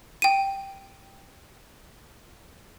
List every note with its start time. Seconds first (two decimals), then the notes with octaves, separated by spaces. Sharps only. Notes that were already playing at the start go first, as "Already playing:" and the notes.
0.22 G5 D#7